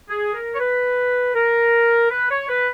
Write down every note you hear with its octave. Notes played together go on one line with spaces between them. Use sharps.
G#4
A#4
C#5
B4
A#4
B4
C#5
B4